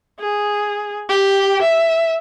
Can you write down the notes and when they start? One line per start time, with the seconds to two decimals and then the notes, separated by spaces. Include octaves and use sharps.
0.19 G#4
1.09 G4
1.62 E5